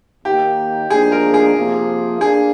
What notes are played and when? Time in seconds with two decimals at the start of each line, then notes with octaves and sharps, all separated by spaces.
0.25 D#2 D#3 A#3 G4
0.90 G#2 F3 A#3 D4 G#4
1.12 A#4
1.34 G#4
1.56 C3 F3 A#3
2.21 A#3 D4 G#4